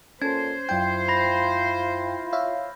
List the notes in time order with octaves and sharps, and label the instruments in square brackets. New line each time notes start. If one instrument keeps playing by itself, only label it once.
[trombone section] A#2 A4 [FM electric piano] C#4 [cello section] C5 [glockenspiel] G#6
[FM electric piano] F#2 G5 [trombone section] E4 F4 [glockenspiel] G6
[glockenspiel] B5 A#6
[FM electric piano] C#5 E5 F5